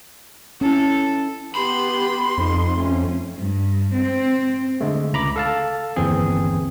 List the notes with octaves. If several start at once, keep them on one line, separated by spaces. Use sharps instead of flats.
C#4 E4 A4
B3 G4 B5 C6
F2 D#4
A3 C#4
G2
C4
D3 G#3 A3
C#2 A#5 B5 D6
A4 F5 A5
G1 D#2 E3 C4 G#4